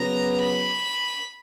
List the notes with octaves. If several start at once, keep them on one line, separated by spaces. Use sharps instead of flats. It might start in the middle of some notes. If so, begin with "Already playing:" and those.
Already playing: C#3 F#3 B3 A#5
B5